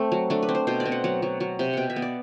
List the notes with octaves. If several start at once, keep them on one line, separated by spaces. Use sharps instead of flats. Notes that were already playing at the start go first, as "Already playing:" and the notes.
Already playing: A3 C4
F#3
A3 D4
B4
C4
C5
B2 C5
D5
C4
F#5
F#3 F#5
F#3
F#3
C3
B2 F#5 G5
E5
B3
D5